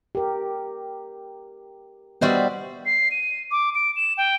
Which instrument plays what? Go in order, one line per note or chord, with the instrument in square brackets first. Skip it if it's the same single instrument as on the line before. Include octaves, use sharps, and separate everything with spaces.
[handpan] G4 A#4
[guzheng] G3 F#4 C5 [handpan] B3 D#5 E5
[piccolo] C7
D#7
D6
D7
E7
G5